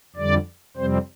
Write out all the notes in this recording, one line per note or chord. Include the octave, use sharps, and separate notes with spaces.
F2 D3 G3 D5
F2 C3 G3 C4 C5